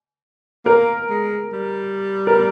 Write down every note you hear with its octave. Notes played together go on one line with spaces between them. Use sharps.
A#3 A#4
G#3
G3
A#4